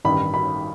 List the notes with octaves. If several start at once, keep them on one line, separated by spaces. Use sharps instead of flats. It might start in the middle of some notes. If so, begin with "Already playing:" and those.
A1 G2 D#3 B5
B5